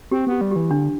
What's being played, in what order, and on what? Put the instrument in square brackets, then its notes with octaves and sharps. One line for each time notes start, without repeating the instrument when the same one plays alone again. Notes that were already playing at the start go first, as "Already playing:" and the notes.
[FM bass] C4 [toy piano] G4
[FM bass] B3 [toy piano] G4
[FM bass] G3
[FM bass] E3 [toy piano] G4
[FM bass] D3 [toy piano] D4